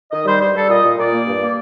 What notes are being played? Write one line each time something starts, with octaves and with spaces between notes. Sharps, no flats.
D#3 D#5
G3 C5
G2 C5
G3 A4
A#2 D#5
A#2
A#2 D5
A#3
G2
A#3